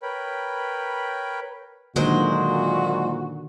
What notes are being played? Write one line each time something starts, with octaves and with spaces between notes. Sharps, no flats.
A#4 B4 C#5 G5 B5
A#2 D3 D#3 F#3 G#3 F#4 C5